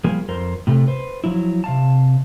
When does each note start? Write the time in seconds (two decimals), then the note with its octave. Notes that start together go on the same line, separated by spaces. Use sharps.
0.04 F3 G3 A#3 G#4
0.28 F2 A#4 C5
0.67 A2 C3 A3
0.88 B4 C5
1.24 F3 F#3 E4
1.64 C3 F5 A5